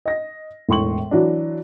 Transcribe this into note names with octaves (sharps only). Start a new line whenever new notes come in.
D#5 A#6
E1 A2 C6 C#6 F#7
E3 F#3 D4